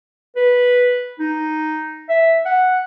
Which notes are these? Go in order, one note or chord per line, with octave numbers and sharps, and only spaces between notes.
B4
D#4
E5
F#5